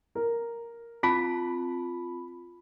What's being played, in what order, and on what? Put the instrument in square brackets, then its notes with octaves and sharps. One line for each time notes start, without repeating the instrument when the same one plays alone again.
[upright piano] A#4
[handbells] C4 F4 A5 [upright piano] B5